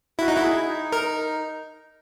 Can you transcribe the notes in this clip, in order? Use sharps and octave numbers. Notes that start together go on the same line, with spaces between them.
E4 F#4
D#4
E4 F#4
G#4
D#4
A#4